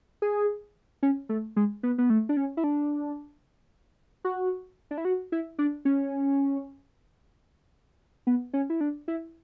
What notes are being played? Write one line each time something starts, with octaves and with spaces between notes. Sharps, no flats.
G#4
C#4
A3
G#3
B3
B3
A3
D4
C#4
E4
D4
F#4
D4
E4
F#4
E4
D4
C#4
B3
C#4
E4
D4
E4